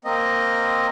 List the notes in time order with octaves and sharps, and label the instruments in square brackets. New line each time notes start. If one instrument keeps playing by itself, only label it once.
[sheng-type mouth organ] A#3 C4 D#5